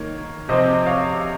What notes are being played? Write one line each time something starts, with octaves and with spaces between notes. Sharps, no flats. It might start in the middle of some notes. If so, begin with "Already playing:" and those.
Already playing: D#3 A#3 C#5
C3 F3 C4 C5 D#5
C#5 F5